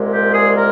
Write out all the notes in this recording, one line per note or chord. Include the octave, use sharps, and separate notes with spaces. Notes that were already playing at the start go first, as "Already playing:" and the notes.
Already playing: C2 A#2 G#3
G4
G#4
A#4